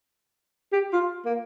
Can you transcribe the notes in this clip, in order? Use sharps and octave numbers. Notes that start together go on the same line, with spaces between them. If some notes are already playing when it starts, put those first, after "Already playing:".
G4
F4
A#3